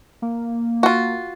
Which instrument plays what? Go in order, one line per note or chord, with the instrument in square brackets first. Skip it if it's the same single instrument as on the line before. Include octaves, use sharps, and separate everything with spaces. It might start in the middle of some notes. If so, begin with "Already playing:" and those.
[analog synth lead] A#3
[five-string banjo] F4 F#4